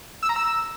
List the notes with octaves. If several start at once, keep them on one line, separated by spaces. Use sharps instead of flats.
E6
A#5
E6